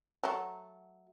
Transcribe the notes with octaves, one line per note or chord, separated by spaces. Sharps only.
F#3 A3